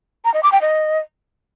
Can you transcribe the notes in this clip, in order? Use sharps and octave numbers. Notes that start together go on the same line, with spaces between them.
A#5
D#5
D6
G5
D#5